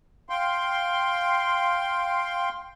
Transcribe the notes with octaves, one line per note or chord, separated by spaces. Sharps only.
F5 G5 C6